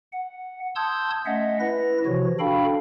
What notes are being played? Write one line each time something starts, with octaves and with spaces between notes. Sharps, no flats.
F#5
A5 C6 D#6 E6 G6 G#6
A3 C#4 D#5 E5 F#5
E4 B4 A#6
C3 E3 F3 F#4 C#5
D4 F#4 A4 F5 G5 B5